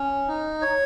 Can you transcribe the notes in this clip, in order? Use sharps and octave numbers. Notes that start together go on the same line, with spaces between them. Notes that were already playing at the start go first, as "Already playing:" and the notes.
Already playing: C#4
D#4
C#5